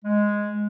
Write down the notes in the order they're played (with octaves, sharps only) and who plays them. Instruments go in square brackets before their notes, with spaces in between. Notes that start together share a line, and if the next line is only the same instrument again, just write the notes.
[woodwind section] G#3